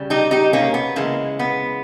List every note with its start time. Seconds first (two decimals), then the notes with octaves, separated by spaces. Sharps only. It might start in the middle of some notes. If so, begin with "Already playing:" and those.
Already playing: C#3 G3
0.10 D#4 G4
0.31 D#4 G4
0.53 A#3 C#4
0.74 B3
0.96 C#3 E3 G#3 A#3
1.39 B3